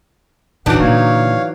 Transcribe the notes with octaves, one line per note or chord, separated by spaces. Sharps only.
A1 E2 E3 F#3 D4 D#4 F#5
A#2 D3 C#5 F5